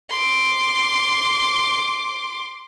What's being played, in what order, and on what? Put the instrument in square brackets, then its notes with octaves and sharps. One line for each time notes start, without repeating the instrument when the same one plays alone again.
[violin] C6 D6